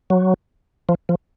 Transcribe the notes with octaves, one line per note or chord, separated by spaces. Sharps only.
F#3
F3
F3